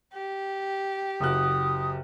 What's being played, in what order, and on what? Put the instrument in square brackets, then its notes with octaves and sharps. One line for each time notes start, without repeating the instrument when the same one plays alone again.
[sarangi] G4
[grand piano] F#1 F#4 F#6 [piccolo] D#6